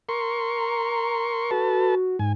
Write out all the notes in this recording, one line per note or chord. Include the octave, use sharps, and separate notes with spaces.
A#4 C6 C#6
A#5
F#4 A4 B4 A5
G#2 G#5